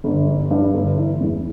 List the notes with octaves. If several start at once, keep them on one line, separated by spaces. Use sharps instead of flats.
G1
G2
G2
G1
E3
E2